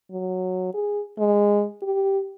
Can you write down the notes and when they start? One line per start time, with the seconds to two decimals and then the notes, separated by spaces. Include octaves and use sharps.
0.12 F#3
0.74 G#4
1.19 G#3
1.82 G4